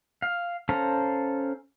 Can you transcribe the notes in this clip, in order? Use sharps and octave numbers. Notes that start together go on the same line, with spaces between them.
F5
C#4 A4 C5 F5 A#5